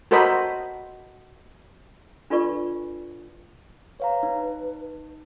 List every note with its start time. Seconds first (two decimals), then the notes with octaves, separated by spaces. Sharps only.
0.11 F#4 A4 A#4 C5 D#5 B5
2.30 D4 F4 A4 B4 D5 C#6
4.00 B4 C#5 F5 A#5
4.23 D#4